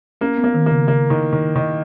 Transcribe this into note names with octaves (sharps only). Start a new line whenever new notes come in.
A#3 C#4
B3
A#3
D#3
A#3
C#3
C#3 A#3
D#3
D#3
D#3